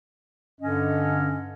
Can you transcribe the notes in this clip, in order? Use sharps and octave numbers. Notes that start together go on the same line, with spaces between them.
G2 D3 C#4 D#5